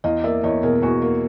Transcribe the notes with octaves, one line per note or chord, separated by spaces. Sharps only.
E2 D#5 F5
A#3 D5 E5
E2 C#5 D#5
B2 G#4 A#4
E2 F#4 G#4
A#3